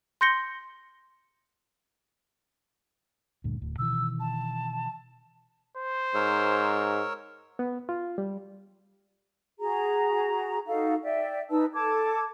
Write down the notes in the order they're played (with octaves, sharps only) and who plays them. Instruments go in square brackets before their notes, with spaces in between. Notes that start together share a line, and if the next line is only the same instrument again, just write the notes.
[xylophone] C6 G6 A#6 C#7 G7
[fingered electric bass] D2 G2 A#2
D1 D2
[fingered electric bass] B2 D#3 E3 [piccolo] E6
[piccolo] A5
[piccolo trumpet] C5
[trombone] G#2 [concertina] A#4 C#5 E6
[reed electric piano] B3
F4
G3
[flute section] F#4 G#4 A#5
D#4 F#4 A4 F5
D5 E5 G5
D#4 B4 A5 E6
A4 A5 D6 G#6